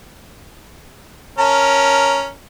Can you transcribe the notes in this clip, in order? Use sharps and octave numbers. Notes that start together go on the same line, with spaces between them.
C#4 A#4 A5